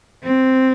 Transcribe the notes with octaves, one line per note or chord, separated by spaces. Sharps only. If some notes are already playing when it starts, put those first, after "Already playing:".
C4